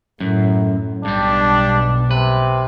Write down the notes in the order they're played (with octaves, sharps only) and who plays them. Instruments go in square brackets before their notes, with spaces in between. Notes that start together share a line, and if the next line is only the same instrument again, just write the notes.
[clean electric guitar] F#2 [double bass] A2
[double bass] B1 B2 [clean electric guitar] G2 G3 [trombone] D4
[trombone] C3 [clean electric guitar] B4